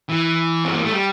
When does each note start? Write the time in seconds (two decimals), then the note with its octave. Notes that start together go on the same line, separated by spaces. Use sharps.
0.09 E3
0.65 C4
0.74 A#3
0.83 A3
0.92 G3